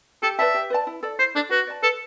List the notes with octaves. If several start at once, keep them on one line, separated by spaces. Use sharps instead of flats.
G4 A4
B4 D5 E5 A5
G4
B4 D5 A5
E4
A4 D5
E4 C5
D4 A4 D5
F#4 B4
D5 A5
A4 B4